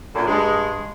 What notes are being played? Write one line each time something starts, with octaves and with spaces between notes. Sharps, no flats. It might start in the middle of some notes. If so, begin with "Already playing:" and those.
F#2 A#2 D3
G2 G#3